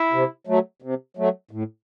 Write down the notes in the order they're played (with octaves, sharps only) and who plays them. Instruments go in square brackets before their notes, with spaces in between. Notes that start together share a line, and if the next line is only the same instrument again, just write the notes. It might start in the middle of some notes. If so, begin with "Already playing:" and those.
Already playing: [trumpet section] E4
[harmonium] C3
F#3 A3
C3
F#3 A3
A2